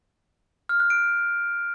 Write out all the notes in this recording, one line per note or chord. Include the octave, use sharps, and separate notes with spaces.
F6
F#6
D7